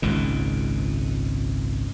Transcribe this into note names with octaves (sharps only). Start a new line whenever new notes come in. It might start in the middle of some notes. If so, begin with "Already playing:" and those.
G#1 C#2 A#2